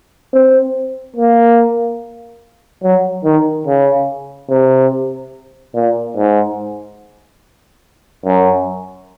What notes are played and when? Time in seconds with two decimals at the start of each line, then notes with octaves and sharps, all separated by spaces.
0.33 C4
1.16 A#3
2.83 F#3
3.25 D#3
3.67 C#3
4.50 C3
5.75 A#2
6.17 G#2
8.25 F#2